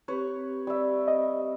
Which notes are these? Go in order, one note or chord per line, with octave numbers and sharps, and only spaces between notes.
C4 G4 B4 C#5
G3 E5
D#5